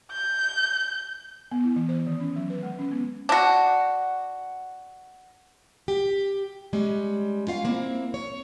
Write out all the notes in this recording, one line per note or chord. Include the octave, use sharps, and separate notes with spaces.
G6
B3
E4
E3
C5
D#3
C#4
F#3
B4
G#3
C#4
B3
D4 F#4
G4
G3 G#3 C#4
C#4 F4 F5
A#3 C4 E4
C#5